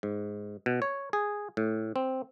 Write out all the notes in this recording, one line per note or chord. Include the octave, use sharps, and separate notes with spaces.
G#2
B2
C#5
G#4
A2
C4